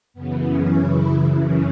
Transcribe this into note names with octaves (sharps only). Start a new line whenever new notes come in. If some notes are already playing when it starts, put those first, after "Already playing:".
F#2 C#3 E3 B3
C#4
E4
C#4